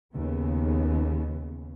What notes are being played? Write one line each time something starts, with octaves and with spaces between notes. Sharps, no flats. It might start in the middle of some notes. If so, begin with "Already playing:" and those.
D#2 C#3 B3